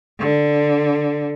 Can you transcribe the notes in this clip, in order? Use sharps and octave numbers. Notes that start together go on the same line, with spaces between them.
D3